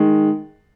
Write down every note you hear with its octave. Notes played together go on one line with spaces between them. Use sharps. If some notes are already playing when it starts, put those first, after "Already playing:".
Already playing: D#3 G#3